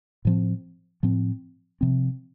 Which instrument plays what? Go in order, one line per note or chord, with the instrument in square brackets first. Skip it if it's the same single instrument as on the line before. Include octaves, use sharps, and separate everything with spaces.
[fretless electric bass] A2 F3 C4
A2 F3 C4
C3 F3 C4